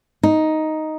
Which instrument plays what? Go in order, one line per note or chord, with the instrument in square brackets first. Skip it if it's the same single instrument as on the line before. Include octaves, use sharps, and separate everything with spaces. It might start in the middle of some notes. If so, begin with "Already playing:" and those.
[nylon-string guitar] D#4